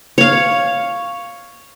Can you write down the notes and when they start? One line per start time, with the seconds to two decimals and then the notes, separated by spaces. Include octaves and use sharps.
0.18 C#5 F5